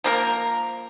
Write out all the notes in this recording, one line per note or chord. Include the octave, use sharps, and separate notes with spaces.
F3 A#3 A#4